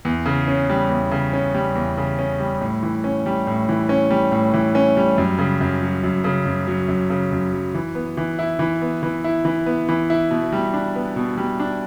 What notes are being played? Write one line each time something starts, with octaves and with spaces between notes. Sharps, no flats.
E2
C#3
C#4
G3
E2
C#3
C#4
G3
E2
C#3
C#4
G3
A2
E3
C#4
G3
A2
E3
C#4
G3
A2
E3
C#4
G3
F#2
C#3
F#2
F#3
F#2
C#3
F#2
F#3
F#2
C#3
F#2
F#3
E3
B3
E3
E4
E3
B3
E3
E4
E3
B3
E3
E4
B2
G3
D4
B3
B2
G3
D4